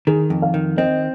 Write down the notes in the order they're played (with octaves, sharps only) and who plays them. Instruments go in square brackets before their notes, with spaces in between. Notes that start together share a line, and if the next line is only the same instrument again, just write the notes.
[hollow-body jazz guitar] D#3 [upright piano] G#4
[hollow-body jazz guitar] F2
[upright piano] F5
[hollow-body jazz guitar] D#3
[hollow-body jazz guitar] C4 [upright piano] D#5